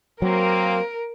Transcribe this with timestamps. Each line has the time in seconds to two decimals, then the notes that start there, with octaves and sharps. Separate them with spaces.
0.22 F#3 A#3 C4 A#4